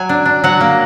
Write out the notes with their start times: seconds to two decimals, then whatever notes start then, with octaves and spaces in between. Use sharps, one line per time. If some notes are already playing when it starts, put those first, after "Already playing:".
Already playing: F#3 G#5
0.09 D4
0.26 D4
0.44 F#3 F#5
0.61 A#3